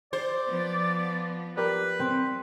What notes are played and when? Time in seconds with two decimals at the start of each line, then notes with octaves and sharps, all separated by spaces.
0.13 C5 D5
0.47 F3 B3
1.57 G4 A#4 B4 D5
2.00 G3 C4